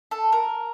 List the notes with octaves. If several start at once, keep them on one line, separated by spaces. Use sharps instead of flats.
A4
A#4